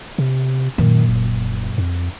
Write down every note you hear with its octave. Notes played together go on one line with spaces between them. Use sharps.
C3
F#2 A#2 D#3
D#1
F2